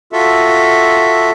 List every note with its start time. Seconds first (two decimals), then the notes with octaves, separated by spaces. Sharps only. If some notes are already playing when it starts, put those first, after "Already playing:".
0.12 F4 F#4 A4 E5